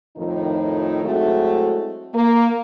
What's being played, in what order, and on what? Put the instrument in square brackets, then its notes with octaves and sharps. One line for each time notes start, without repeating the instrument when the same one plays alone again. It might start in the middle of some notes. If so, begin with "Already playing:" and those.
[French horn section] F2 A2 D#3 F3 D#4
F#3 G#3 A3 C4 E4 F#4
A#3